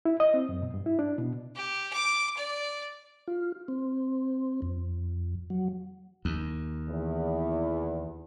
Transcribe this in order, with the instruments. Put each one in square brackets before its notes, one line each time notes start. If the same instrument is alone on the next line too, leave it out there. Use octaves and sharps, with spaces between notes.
[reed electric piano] E4
D#5
C4
F#2
B2
G2
E4
D4
B2
[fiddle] G4
D6
D5
[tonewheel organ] F4
C4
F2
F#3
[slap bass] D#2
[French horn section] E2